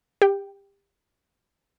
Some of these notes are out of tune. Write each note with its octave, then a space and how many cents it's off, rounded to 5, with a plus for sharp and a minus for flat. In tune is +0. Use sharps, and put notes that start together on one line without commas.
G4 +25 G5 +0